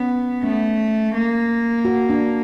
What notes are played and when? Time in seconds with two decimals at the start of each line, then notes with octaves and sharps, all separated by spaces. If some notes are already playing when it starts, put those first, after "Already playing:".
Already playing: B3 C#4
0.43 A3 C#4
1.14 A#3
1.85 F#4
2.10 D4